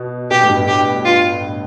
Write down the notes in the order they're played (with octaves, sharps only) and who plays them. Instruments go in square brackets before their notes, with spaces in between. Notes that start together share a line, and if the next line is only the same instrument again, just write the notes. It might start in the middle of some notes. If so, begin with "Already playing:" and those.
Already playing: [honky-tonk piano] B2
[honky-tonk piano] B2 [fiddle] G4
[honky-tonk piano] A2
G2
[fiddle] G4
F4